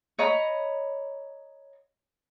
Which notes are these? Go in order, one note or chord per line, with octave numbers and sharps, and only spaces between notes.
C#5 D#5 A#5 B5